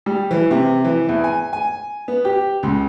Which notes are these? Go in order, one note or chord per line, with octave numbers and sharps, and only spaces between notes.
G3
E3
C3
E3
E2
G#5
G#5
B3
G4
C#2